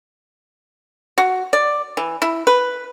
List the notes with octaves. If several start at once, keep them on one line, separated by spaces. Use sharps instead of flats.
F#4
D5
E3
E4
B4